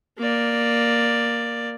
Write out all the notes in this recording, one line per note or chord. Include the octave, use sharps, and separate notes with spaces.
A#3 D5